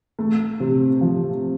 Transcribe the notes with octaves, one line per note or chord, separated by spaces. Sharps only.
A3
C3
F3